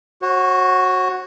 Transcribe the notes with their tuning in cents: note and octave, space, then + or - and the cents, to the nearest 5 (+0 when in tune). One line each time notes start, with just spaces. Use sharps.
F#4 +0 C#5 -45